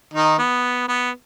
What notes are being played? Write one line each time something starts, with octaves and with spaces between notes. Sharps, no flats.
D#3 D#4
B3
B3